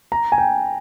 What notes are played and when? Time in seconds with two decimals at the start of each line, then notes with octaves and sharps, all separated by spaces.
0.12 A#5
0.32 G#5
0.38 G5